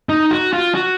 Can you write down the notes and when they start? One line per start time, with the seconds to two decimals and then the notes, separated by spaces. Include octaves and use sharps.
0.09 D#4
0.31 F#4
0.53 F4
0.75 F#4